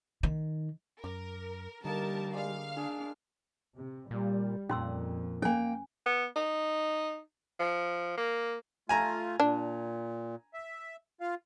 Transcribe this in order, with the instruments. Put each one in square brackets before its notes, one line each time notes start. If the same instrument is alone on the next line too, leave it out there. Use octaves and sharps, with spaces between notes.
[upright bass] D#3
[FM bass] F#2 [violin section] A#4 [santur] D6
[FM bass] D3 [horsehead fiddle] G3 [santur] A#3 D#4 [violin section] A#4 A5
[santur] G#3 D5 [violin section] F5 F6
[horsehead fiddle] D4 [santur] G#4
[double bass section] C3
[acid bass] A#2 [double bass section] G3
[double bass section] F2 [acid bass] A#2 [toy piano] C#4 C6 E6
[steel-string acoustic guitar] A#3 G5 [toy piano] C#4 G#5
[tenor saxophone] B3
D#4
F3
A#3
[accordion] A3 F4 [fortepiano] G#5 A#5
[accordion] A#2 [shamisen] D4
[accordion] E5
F4 F5